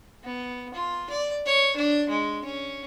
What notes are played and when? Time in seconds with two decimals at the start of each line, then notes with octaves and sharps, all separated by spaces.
0.24 B3
0.74 F4
1.10 D5
1.46 C#5
1.76 D4
2.09 G#3
2.44 C#4